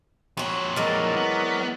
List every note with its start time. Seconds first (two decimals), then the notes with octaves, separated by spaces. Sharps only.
0.37 F2 A#2 F#4 C#5
0.76 E3 F#3 G#3 A#4 D5
1.16 B3